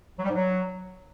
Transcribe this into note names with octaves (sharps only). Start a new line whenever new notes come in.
F#3
G3
G#2
F#3